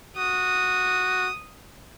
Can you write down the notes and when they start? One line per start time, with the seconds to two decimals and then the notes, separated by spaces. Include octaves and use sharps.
0.16 F#4 D#6